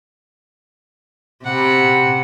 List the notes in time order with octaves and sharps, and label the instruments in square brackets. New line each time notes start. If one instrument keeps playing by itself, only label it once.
[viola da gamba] C3 [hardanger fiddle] F#5 B5